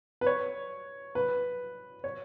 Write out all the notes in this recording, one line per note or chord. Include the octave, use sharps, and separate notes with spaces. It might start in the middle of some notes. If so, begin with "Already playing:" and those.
B4
C#5
B4
C#5